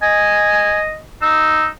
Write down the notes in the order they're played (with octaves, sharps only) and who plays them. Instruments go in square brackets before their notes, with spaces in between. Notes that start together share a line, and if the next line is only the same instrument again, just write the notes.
[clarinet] D#5 [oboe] G#5
[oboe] D#4 [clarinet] E6